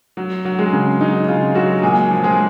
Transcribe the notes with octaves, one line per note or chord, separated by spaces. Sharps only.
F#3
F#3
G#3 G#4
C#3
F#3 D#4
C#3 F4
F#3 F#4
A#2 G#3 G#4
F3
G#3 G#4